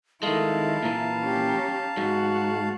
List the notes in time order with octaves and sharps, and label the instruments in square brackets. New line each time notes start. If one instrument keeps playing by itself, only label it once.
[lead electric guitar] D#3 G#3 [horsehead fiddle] E4 [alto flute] A4 [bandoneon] F5 A5
[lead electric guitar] A#2 E3 [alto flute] A#5
[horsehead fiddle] C#4 G4
[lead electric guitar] G#2 [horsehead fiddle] F#4